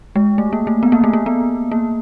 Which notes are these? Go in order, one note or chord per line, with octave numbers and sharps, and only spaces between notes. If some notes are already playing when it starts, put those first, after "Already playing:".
G#3
A3
A#3
A3
B3
A#3
A3
A#3
B3
A#3